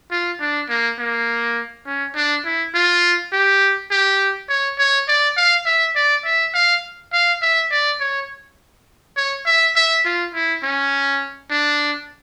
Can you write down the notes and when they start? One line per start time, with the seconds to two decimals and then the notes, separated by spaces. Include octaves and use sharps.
0.11 F4
0.40 D4
0.69 A#3
0.99 A#3
1.86 C#4
2.15 D4
2.45 E4
2.74 F4
3.33 G4
3.91 G4
4.49 C#5
4.78 C#5
5.08 D5
5.37 F5
5.66 E5
5.95 D5
6.25 E5
6.54 F5
7.13 F5
7.42 E5
7.71 D5
8.00 C#5
9.17 C#5
9.46 E5
9.76 E5
10.05 F4
10.34 E4
10.63 C#4
11.51 D4